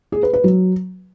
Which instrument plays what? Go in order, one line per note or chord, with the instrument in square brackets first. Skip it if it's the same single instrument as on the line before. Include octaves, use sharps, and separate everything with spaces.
[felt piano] G#4
B4
B4
F#3